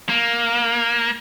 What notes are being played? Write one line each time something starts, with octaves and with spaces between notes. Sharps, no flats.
A#3